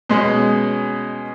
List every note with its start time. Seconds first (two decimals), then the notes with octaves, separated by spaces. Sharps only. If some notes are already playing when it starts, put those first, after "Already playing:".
0.09 B2 G#3 C#4